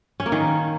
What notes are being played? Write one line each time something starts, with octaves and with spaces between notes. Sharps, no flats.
C#4
A#3
D#3